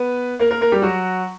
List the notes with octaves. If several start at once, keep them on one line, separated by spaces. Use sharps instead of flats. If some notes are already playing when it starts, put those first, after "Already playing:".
Already playing: B3 B4
A#3 A#4
A#3 A#4
A#3 A#4
G3 G4
F#3 F#4